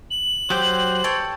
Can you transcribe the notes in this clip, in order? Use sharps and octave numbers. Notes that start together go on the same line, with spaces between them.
F#7
F#3 G4 C5 G5
A4 C#5 G5